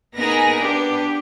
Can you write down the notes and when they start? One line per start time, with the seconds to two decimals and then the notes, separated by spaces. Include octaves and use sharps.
0.15 B3 D#4 G#4 A#4 A#6
0.60 B3 D4 G4